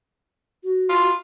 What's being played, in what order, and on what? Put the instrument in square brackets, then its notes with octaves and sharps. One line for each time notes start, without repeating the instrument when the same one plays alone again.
[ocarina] F#4
[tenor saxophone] F4